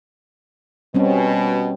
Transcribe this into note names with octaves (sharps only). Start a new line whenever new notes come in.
B2 G3 C4 C#4